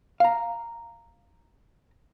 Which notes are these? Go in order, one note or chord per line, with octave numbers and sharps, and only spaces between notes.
F5 A#5